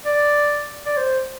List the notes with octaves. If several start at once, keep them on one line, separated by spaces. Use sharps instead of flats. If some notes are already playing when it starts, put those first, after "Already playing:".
D5
D5
C5